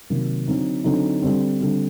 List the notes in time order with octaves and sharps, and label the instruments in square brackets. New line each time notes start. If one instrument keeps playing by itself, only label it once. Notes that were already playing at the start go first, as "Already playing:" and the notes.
[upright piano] C3 D#3 F#3 A#3
D3 F#3 C4 D#4
D3 F#3 C4 D#4
D3 G3 C4
D3 G3 C4